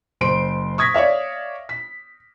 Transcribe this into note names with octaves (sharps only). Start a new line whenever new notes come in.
F#1 C5 C6 D7
C#6 D#6 G#6 A#6 B6
C#5 D5 E5 F5
B6